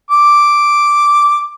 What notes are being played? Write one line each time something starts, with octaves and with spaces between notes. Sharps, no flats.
D6